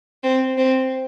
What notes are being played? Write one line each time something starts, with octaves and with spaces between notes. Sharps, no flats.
C4
C4